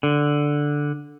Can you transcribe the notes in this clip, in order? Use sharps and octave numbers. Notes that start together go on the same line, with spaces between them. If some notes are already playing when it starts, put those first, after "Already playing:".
D3